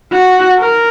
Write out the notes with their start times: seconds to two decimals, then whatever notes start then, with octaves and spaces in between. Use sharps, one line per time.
0.12 F#4
0.59 A#4